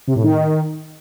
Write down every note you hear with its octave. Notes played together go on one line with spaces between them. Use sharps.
C3
A2
D#3